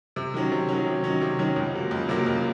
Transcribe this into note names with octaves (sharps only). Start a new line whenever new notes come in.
C3
D#3 F#3 C#4
C3
D#3 F#3 C#4
C3
D#3 F#3 C#4
C3
D#3 F#3 C#4
C#2
C3 F#3 A#3
C#2
C3 F#3 A#3
C#2